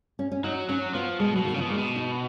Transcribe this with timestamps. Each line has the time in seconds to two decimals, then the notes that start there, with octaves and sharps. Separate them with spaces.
0.19 C#4
0.32 C#4
0.44 F#3 D#4
0.69 F#3 C#4
0.94 F3 B3
1.20 B2 G#3
1.33 F#3
1.36 B2
1.45 D#3
1.54 C#3
1.58 F3
1.61 B2
1.69 A#2 G#3
1.77 B2
1.96 D#4